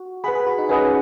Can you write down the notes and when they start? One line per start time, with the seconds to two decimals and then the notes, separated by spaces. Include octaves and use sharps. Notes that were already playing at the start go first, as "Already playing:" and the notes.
Already playing: F#4
0.24 G#4 B4 F#5 B5
0.35 G#4
0.46 F#4
0.58 D#4
0.69 C#4 G#4 B4 D#5 F#5